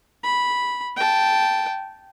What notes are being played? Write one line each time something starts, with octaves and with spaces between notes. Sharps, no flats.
B5
G5 A5